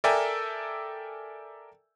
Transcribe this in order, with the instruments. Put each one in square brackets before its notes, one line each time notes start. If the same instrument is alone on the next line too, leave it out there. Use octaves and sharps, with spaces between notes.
[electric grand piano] A4 A#4 D5 E5 G5 G#5